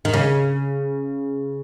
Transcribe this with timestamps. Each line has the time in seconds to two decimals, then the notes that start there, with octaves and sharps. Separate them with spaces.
0.05 D#3
0.13 C#3